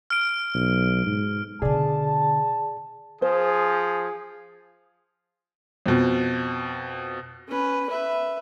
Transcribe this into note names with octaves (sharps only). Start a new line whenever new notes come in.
F6 D7
B1
G#2
B2 D3 G#4 D5 A5
F3 G#4 C5
F2 B2
C#4 B4
B4 E5